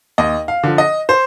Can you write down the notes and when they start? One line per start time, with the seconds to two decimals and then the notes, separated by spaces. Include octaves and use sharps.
0.18 D#2 D#5
0.48 F5
0.63 D3 F3
0.78 D#5
1.09 C5